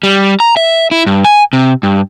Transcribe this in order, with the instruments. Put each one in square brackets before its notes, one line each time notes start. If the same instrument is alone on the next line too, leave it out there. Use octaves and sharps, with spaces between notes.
[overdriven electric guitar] G3
A#5
E5
E4
G2
G#5
C3
G2